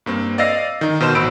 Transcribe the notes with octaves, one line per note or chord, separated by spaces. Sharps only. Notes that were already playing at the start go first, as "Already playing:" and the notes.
G2 A#3 C4
D5 D#5 F5 E6 A#6 C7
D#3 D#4
B2 D#3 C5 C6 E7
A1 B2 B5 E6 D7